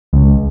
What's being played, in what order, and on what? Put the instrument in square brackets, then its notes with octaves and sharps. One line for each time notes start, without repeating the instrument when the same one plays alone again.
[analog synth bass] C#2